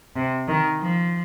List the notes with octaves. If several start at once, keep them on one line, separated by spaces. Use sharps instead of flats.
C3
D#3
F3